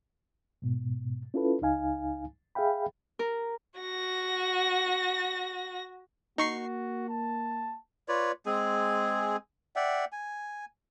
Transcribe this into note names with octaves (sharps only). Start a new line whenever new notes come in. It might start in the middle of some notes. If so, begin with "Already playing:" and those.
G#2 B2
C#4 E4 F4 A4 B4
C#2 D#4 F5 G#5
G#4 E5 F5 G5 B5
A#4
F#4 A#6
A#3 D#4 F#4 C#6 C7
A5
F4 B4 C#5 D5
G#3 C4 G#4 G#5
D5 E5 F#5 G5
G#5